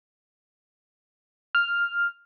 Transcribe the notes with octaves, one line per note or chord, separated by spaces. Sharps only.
F6